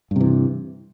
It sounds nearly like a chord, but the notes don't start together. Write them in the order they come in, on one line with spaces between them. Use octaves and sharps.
G2 C3 E3